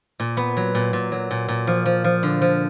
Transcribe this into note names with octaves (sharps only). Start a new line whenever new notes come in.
A#2
B3
F#3
A#2
A#2
F#3
A#2
A#2
F3
F3
F3
D3
F3